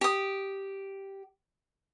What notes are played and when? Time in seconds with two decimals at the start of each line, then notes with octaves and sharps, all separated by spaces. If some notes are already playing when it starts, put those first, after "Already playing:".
0.01 G4 D#6